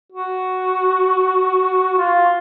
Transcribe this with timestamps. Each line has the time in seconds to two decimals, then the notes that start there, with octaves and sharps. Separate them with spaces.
0.12 F#4
1.98 F4